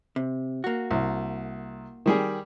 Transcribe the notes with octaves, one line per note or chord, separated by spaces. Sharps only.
C3
A#3 F#4
C2
D#3 G3 G#4